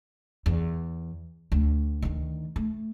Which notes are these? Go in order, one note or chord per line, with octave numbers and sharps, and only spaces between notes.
E2
D2
D2 D#3
A3